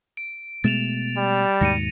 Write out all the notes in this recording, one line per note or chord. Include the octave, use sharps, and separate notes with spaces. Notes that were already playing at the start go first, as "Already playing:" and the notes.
D7
B2 G#3 A3 A6 E7 F7
G3
D#2 G#2 B2 A#6 C#7 D#7